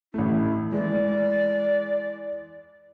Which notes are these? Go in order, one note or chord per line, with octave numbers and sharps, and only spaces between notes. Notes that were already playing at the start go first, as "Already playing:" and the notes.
A1 A3 E4
E3 G#3 D5